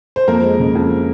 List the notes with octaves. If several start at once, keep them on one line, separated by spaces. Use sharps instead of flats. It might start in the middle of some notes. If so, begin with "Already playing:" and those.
C5
F2 A#3 A#4
G#3
C#3
F2